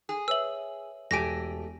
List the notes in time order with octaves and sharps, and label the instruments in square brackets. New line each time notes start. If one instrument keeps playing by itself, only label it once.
[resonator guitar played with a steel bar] G#4
[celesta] B4 C#5 E5 [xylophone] E6 F#7
[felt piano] E1 [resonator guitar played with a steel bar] A3 G4 G#5 [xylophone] A#6 D7